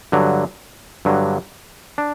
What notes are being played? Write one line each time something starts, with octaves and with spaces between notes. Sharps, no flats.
G2 D3 F#3
G2 D3 F#3
D4